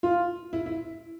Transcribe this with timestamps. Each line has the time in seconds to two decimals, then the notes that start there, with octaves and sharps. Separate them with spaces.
0.03 F4
0.53 E4
0.66 E4